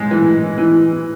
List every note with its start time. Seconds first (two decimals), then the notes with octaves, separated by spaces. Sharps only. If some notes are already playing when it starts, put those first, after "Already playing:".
Already playing: G#2 G#3
0.11 E3
0.58 E3